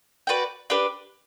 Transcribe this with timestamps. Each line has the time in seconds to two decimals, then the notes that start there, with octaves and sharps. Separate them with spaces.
0.27 F#4 B4 D5 G5
0.70 D4 G4 B4